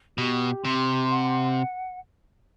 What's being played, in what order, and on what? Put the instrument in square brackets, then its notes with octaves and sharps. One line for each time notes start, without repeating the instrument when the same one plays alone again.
[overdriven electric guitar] B2 [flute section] G4
[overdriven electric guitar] C3 [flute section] C6
[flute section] F#5